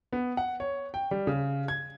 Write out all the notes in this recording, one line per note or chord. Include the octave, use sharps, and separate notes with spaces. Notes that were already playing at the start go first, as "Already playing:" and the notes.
B3
F#5
C#5
G5
G3
C#3
G#6